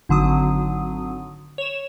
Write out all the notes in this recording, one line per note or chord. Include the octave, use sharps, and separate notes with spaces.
G#1 D3 F#3 D#6
C#5 E7